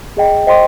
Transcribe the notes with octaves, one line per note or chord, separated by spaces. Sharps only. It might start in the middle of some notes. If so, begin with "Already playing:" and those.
G#4 D#5 G5
C5 D#5 G5 C6